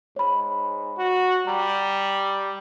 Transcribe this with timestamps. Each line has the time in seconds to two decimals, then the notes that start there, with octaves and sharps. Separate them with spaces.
0.16 G#2 C#5 B5
0.97 F#4
1.47 G3 A#5